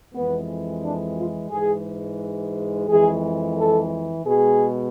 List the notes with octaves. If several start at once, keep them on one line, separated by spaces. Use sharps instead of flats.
F2 E3 G#3 B3
D4
F4
G#2 E3 G#3 G#4
F2 E3 G#3 G#4
A4
B2 G#3 G#4